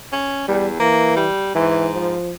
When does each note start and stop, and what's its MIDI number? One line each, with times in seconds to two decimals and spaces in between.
0.12 0.45 61
0.48 0.76 40
0.48 0.67 55
0.80 1.26 52
0.80 1.14 58
1.16 1.53 55
1.55 2.14 44
1.55 1.90 52
1.95 2.32 53